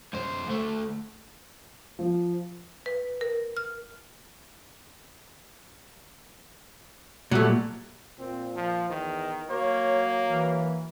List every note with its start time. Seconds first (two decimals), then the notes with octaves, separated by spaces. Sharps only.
0.13 F#2 C5
0.47 D2 A3
1.99 F3
2.86 B4
3.21 A#4
3.57 F6
7.31 A#2 F#3 G3 A3
8.19 A#2 C4
8.56 F3
8.89 E2 D#3
9.50 F#3 A#3 C#5
10.29 E3